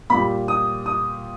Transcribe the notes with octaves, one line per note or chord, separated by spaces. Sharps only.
A#2 G3 B5
D#6
D#6